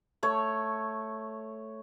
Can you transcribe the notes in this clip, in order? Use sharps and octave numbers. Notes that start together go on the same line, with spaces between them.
A3 C#5